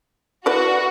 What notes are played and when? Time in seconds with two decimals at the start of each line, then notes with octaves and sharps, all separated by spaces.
0.46 E4 F#4 B4 D5